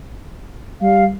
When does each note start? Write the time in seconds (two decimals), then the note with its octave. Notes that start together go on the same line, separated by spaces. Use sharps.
0.81 G3 F5